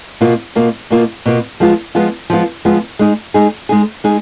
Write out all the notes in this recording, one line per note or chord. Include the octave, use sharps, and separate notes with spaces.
B2 A#3 F4
B2 A#3 F4
B2 A#3 F4
B2 A#3 F4
F3 G#3 B3 F4
F3 G#3 B3 F4
F3 G#3 B3 F4
F3 G#3 B3 F4
G#3 D#4 G#4
G#3 D#4 G#4
G#3 D#4 G#4
G#3 D#4 G#4